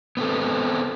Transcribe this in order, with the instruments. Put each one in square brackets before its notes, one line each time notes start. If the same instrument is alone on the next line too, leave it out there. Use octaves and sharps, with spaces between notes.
[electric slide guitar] B3 C4 A4